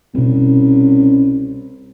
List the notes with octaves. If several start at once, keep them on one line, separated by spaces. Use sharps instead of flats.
C2 B2 C4 C#4